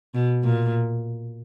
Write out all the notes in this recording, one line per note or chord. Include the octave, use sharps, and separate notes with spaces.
B2
A#2